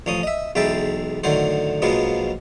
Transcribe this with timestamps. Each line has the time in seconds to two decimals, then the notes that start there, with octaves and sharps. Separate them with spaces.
0.06 A1 F3 C#4 D#6
0.23 D#5 E5
0.55 B1 E2 G#3 E5 G5 A5
1.24 A2 D3 D#3 F#3 C5
1.82 A#1 B2 F3 F#3 G#3 B3